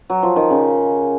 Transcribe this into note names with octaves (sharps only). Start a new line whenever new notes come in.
F#3
F3
D#3
C#3